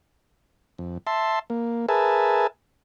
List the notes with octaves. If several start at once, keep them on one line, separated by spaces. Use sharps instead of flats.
F2
E5 A5 C6
A#3
G#4 A#4 B4 E5 G#5 A5